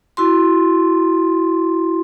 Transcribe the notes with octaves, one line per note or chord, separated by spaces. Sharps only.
E4 F#4 C6